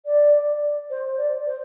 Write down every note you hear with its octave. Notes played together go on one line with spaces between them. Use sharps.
D5
C5
D5
C5